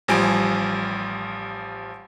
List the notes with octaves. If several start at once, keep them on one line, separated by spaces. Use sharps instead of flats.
A1 F3 G3 G#5 D7